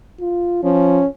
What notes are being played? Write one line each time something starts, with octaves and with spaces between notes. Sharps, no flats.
F4
F3 C#4